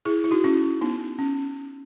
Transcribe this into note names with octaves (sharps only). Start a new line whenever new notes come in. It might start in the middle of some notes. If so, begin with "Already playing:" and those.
E4 G#4
E4
D#4 F#4
C#4 E4
B3 D#4
C#4